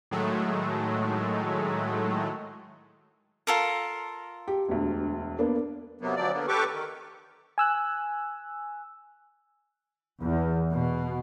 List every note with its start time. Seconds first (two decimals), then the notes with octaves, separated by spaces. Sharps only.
0.11 A2 D#3 F#3 G#3 A3
3.47 F4 A4 A#4
4.48 G4
4.68 E1 D2
5.39 A#3 B3 D4
6.01 C3 F#3 A#3 B3
6.16 D2 F3 F#3 D5
6.32 D3 A#3 B3
6.48 G4 A4 B4 C#6 D6
6.72 D#3
7.58 G#5 E6 F#6
10.22 E2
10.70 B2